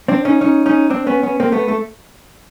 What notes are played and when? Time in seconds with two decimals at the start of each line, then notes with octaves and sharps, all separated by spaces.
0.08 C4 D4
0.25 C#4 D#4
0.41 C#4 D#4
0.66 C#4 D#4
0.90 C4 D4
1.07 B3 C#4
1.23 B3 C#4
1.40 A#3 C4
1.52 A3 B3
1.68 A3